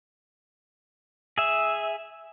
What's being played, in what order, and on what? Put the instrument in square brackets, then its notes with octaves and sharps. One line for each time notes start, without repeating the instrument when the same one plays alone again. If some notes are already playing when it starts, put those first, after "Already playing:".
[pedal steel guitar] G#4 E5